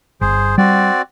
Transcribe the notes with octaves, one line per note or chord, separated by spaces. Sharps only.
G1 G#4 C5
G3 C4 F#4 D5